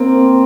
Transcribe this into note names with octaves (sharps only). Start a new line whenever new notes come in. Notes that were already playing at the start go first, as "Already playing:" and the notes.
Already playing: A#3 C4